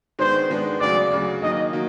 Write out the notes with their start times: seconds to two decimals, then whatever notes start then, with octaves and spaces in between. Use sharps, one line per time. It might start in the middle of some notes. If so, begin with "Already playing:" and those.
0.19 D#3 G#3 B3 D4 C5
0.50 D#3 G#3 B3 D4
0.80 D2 C#3 F#3 D5
1.12 D2 C#3 F#3
1.42 D#3 F#3 A#3 D#5
1.73 D#3 F#3 A#3